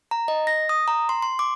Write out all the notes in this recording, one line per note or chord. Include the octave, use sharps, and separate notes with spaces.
A#5
D#5
A#6
D#6
A#5
C6
C6
D6